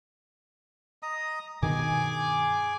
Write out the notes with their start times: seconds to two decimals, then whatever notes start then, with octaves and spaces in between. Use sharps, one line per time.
1.03 D#5 A#5 D#6
1.62 G2 B2 D#3 G#4 G#5 D6